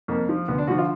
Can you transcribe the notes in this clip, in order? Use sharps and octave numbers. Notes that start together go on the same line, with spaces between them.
F2 A#3
F3
D2 B3
D4
D3 F3 F#4
F4